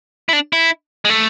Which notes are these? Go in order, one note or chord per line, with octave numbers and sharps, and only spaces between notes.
E4
D4
E4
G#3
A3